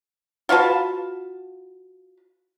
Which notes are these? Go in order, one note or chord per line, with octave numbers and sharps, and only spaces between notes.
F4 F#4 B4 A5